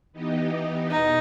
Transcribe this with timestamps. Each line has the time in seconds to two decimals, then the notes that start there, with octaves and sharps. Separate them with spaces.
0.13 E3 B3 D#4 G4 D#5
0.90 E2 B2 D#4